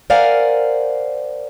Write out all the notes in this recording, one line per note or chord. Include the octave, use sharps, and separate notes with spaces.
A#4 C5 D5 F5 F#5 G#5